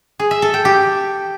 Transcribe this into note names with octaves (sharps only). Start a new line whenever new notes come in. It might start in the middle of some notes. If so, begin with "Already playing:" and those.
G#4
E5
A4
G5
G4